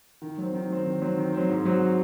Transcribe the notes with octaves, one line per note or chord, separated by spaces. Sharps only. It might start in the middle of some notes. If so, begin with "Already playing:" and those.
D#3
F#3 C4
D#3
F#3 C4
D#3
F#3 C4
D#3
F#3 C4
G#2
F#3 C4 F#4